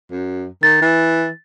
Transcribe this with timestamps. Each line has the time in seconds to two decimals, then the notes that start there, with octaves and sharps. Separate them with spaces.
0.12 F#2
0.63 D#3 A6
0.82 E3